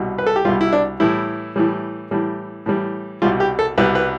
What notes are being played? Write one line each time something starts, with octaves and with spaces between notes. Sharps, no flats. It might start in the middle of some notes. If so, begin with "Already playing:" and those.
Already playing: C2 B2 G3
B4
A4
G4
C2 B2 G3 F4
E4
D4
A2 E3 G3 E4
A2 E3 G3
A2 E3 G3
A2 E3 G3
C2 B2 G3 F4
G4
A4
C2 B2 G3 B4
B4